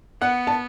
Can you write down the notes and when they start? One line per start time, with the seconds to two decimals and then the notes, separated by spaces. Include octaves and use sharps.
0.21 B3 F#5
0.47 A5